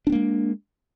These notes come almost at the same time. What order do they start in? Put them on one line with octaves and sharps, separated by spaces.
D4 C4 A#3 G#3